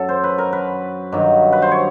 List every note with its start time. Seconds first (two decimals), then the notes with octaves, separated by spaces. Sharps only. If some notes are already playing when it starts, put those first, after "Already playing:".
Already playing: F#2 F#3 A4
0.09 C5
0.24 B4
0.38 A#4
0.53 B4
1.12 G2 D#3 F#3
1.52 B4
1.62 C5
1.71 C#5